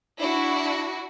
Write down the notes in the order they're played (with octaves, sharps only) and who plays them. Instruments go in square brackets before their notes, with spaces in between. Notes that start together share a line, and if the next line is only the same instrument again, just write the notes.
[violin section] D4 E4 F#4